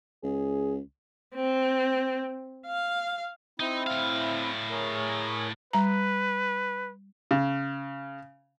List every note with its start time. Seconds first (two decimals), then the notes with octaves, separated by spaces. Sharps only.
0.23 C#2 G#4
1.35 C4
2.67 F5
3.60 C4 D#4 E4
3.87 A2 F5
4.71 G#4 A#4 C#5
5.73 G3 B4 A#5
7.31 C#3